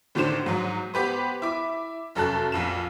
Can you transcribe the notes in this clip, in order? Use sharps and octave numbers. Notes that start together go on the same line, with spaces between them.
A2 D3 D#3 D4 C5 E7
G#2 F#3
B3 G4 B4 C5
E4 D6
F1 F#2 A4 A5 F#6
A#1 F2 E7